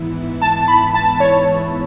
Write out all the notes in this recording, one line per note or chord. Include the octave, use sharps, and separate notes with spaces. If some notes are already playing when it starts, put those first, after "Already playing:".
Already playing: G#2 E3 B3 E4
A5
B5
A5
C#5